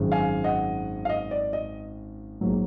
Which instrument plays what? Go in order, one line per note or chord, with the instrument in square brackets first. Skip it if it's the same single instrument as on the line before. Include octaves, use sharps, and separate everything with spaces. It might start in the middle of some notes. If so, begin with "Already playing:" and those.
Already playing: [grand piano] G#1 F#2 D#3 G#3
F5 G#5
D#5 F#5
F5
D#5
D5
D#5
A#1 G#2 F#3 A#3